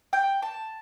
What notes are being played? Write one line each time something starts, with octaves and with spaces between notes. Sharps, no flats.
G5
A5